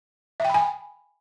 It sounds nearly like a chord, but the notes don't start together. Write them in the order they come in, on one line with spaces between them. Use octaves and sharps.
E5 G5 B5 G#5